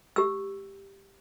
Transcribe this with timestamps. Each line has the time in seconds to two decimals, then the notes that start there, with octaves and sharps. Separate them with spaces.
0.16 G4 E6